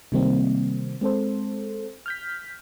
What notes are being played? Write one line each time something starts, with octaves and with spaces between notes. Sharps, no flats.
C3 D#3 G3 A#3 C4
G#3 C4 A4 C5
F6 G6 B6